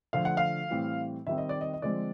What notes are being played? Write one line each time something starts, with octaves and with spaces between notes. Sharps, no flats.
D3 F3 A3 F5
F#5
F5
A2 E3 G3 C4
D#3 G3 C4 E5
D#5
D5
D#5
D#5
D3 F3 G#3 C4 D5